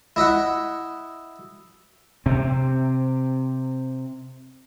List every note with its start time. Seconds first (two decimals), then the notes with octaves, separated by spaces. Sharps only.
0.16 E4 D#5 E5 F#5
2.26 C3 C4